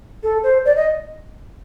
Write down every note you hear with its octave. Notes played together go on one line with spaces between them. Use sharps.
A4
C5
D5
D#5